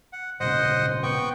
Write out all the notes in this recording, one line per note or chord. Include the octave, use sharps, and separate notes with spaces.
F#5
G#1 A#2 C#3 C5 D#5 F#5
B3 G5 C#6